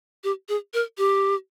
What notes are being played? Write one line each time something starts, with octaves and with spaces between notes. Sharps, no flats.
G4
G#4
A#4
G4